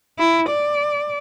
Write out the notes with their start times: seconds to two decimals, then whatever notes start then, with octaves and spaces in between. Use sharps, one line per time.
0.19 E4
0.50 D5